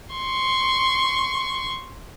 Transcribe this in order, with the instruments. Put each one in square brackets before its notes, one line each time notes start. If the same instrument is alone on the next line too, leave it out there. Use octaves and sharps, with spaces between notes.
[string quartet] C6 C#6